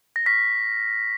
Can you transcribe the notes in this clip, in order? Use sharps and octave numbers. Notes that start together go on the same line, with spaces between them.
A#6
C#6 F6 B6